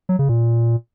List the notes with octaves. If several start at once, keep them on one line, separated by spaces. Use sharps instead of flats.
F#3
C#3
A#2